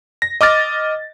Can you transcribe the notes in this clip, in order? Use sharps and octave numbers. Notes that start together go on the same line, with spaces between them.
A#6
D#5 D6 F6 A6